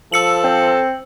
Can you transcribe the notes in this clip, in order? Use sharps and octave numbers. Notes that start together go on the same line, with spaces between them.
F3 A4 E6 C#7 F#7
C4